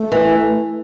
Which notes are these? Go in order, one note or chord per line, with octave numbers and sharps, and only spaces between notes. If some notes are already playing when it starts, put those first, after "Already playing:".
Already playing: A3
E3